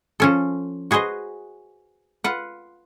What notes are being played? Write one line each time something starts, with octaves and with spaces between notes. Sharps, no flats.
F3 C#4 A4
F#4 G#4 B4 C5 D#5
F4 B4 F#5